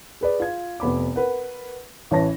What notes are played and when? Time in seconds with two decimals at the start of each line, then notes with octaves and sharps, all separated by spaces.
0.21 G#4 B4 D5
0.40 F4 G#6
0.80 F1 B3 B5 D6
1.16 A#4 B4 F#5
2.11 A1 E3 C#5 A5 A#6